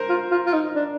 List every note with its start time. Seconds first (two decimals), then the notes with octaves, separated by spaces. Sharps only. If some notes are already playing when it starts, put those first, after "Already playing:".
Already playing: A#4 C5
0.09 F4
0.31 F4
0.46 F4
0.53 D#4
0.75 D4